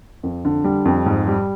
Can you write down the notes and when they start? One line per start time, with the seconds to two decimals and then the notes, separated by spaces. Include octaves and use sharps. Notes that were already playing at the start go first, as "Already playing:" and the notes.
0.23 F2
0.45 D3
0.64 G3
0.85 F2
1.06 G#2
1.28 G3